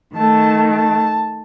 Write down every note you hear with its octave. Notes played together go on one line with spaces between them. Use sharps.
D#3 A3 A5
A5